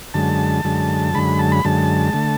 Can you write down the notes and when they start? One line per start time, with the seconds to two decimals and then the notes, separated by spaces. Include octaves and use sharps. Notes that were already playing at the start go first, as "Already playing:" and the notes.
0.14 F#2 D3 G#3 A5
0.64 F#2 D3 G#3
1.14 F#2 D3 G#3 B5
1.39 A5
1.52 B5
1.65 F#2 D3 G#3 A5
2.14 D3 A3